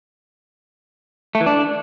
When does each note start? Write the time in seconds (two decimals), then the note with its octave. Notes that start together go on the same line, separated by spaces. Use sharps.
1.35 A3
1.41 E3
1.46 D4